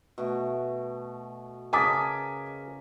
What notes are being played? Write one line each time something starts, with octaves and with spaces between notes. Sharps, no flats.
B2 A3
C#3 G#4 A#4 D#5 G#5 A5 D6 B6